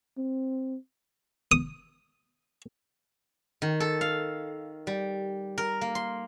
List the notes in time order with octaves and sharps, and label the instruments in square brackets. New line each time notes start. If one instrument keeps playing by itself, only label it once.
[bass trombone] C4
[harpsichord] D#6
[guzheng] D#3
A4
F5
G3
A#4
A#3
C6